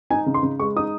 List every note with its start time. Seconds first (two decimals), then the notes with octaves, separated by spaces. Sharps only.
0.10 D#4 G#5
0.26 C#3
0.34 C6
0.43 C#3
0.60 G#3 C#6
0.76 D#4 D#6